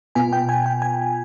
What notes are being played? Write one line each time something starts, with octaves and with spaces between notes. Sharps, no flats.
B2 B3 F4 G#5
G5
G#5
G5
G#5